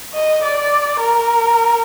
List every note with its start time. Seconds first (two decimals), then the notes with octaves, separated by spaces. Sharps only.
0.14 D#5
0.44 D5
1.00 A#4